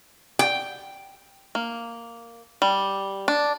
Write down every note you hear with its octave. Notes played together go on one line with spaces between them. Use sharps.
G5
A#3
G3
D4